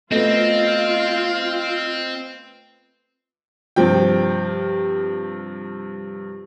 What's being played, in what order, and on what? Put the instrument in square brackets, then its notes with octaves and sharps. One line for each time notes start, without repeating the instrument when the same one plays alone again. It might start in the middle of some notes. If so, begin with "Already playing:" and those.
[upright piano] A3 B3 [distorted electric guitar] C4 [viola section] F4 F5 [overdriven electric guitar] D#5
[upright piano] G2 C3 F3 G5